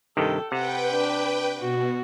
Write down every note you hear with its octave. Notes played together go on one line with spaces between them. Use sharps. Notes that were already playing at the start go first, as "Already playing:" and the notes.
G2 C3 D#3 A4 G5
C3 B4 F#5 G5
D4
B2 F#4